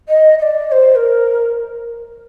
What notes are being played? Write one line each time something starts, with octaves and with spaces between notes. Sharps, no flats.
D#5
D#5
D5
D5
C5
A#4